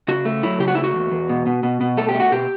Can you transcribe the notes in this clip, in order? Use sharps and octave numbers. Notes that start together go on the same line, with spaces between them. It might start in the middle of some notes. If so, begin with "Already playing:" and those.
C#3 F#4
A3
F#3 E4
C#3 G4
F#4
A3 E4
F#4
E2
E2
B2
B2
B2
B2
A3 A4
G4
A3
F#4
B2 G4